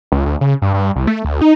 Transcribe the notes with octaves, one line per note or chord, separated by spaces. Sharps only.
C#2
D2
C#3
G2
G2
C2
A3
D2
D#4